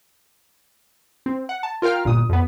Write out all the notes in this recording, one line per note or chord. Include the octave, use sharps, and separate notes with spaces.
C4
F#5
A5
F4 A#4 F5 G5 F6
G1 A#2 D#6
F2 B3